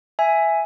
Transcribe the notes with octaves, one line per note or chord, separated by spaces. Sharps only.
E5 G#5